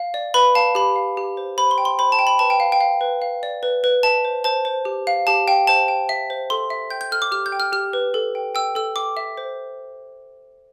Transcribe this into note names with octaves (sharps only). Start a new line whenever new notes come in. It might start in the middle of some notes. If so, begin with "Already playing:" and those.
Already playing: F5
D5
B4 B5
F5 A5
G4 B5
F5
G4
C5
C5 B5
C6
G5
C6
C5 B5
A5
G5
B5
B4 A5
G5
F5
G5
F5
B4
F5
D5
B4
B4
E5 A5
C5
C5 A5
C5
G4
F5
G4 A5
F5 G5
C5 A5
G5
E5
C5
A4 C6
E5
G5 G6
G6
A4 F6
D6
G4 F6
G6
G5
F6
G4 F6
B4
A4
G5
G5 E6
A4 E6
G5 D6
E5
C5